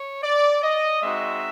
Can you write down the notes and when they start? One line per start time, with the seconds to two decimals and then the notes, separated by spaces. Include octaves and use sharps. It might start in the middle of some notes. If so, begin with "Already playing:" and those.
Already playing: C#5
0.23 D5
0.63 D#5
1.02 G#3 C4 D#4 F#4 E5